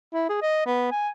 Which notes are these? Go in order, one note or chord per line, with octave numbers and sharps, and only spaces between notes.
E4
G#4
D#5
B3
G#5